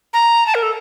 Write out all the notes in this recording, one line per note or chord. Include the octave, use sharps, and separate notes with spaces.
A#5
A5
A#4
A4